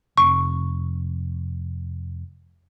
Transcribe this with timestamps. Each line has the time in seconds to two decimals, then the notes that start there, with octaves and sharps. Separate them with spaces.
0.18 F1 C#6